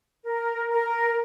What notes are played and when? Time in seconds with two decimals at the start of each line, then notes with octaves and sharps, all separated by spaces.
0.25 A#4
0.70 A#4